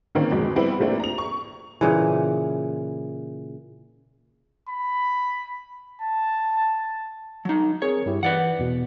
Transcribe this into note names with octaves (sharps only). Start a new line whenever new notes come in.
D3 D#3 A#3 C4 C#4
F2 B2 G#3
G3 B3 C4 E4
C3 F3 A3 A#3 C4 D4
A#5 F7
C#6
A#2 C#3 E3
B5
A5
F#3 D#4
C4 G#4 A#4 C#5
G2 E4 G4
E3 B4 D5 F#5
E2 B2